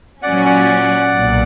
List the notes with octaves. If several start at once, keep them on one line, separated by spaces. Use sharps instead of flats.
A#2 F#3 C#4 D5 F#5
D5 F#5
B1 A#2